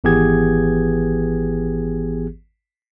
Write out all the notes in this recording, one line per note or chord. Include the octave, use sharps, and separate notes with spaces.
G#1 E3 B3 G4 G#4 G#6